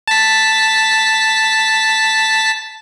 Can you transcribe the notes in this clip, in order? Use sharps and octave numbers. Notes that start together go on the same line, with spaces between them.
A5 B6